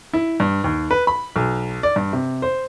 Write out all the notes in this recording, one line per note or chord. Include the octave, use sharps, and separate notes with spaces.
E4
G2
D#2
B4
B5
B1
D5
G2
C3
C5